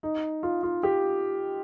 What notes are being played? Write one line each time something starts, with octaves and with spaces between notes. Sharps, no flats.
D#4
F4
F4
G4